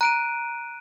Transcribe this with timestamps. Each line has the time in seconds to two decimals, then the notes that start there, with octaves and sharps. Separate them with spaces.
0.01 A#5 F#6 D7 D#7